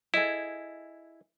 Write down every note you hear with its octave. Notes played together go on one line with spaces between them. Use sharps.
E4 G#4 A4 D#5